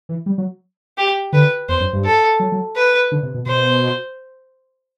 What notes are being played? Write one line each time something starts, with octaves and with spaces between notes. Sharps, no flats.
E3
G3
F#3
G4
D3 B4
E2 C5
F#2
G2
A4
F#3
F#3
B4
D3
C3
B2
B2 C5